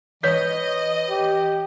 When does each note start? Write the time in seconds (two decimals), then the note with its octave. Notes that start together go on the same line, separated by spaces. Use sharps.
0.23 E3 C#5 D#5 G6 B6
1.10 G4